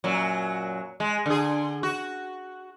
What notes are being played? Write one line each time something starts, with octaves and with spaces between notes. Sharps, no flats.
F#2 A#2 F#3
G#3
D3 G#4
F#4